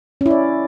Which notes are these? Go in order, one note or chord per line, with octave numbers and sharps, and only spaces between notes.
C#4 E4 D5